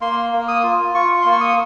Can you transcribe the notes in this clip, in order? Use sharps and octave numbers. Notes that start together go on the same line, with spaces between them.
A#3 C6
A#3
D#6
F4
F4 C#6
A#3 C6
C#6
D#6